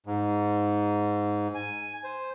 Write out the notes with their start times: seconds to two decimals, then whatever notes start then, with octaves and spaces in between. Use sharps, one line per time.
0.06 G#2
1.55 G#5
2.04 C5